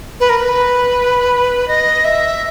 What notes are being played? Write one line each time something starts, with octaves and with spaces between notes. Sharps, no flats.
B4
A#4
B4
D#5
E5